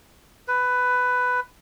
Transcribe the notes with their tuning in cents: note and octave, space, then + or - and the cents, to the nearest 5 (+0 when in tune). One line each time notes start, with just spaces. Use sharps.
B4 +10